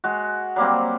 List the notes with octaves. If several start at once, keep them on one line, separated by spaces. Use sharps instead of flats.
G#3 F#4
F#3 G3 A#3 C4